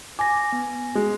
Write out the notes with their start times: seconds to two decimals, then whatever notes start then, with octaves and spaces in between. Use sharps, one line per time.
0.19 G#5 D6 A#6
0.52 B3
0.95 G#3